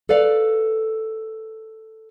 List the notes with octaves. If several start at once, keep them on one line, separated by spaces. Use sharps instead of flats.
A4 B4 D5 F5